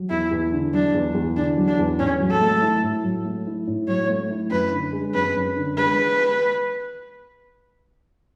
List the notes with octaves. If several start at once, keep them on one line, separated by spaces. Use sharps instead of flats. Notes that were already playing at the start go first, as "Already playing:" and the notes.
Already playing: F#3
E2 E4
E2
D3
F#3 D4
E2
E2
D3 D4
F#3
D4
E2
A2 C#4
F#3
A4
A3
E4
A2
F#3
A3
E4
A2
F#3 C#5
A3
E4
F#2 B4
D3
G#3
F#2 B4
F#2
D3
G#3 B4